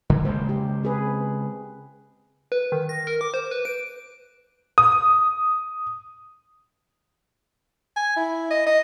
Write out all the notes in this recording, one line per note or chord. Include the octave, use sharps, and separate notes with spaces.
D3
C#3 G#3 A#3 C5
G4
C4 G#4 B4
B4
D#3
A#6
A#4
D6
C5
B4
D7
D#6
G#5
E4
D#5
D#5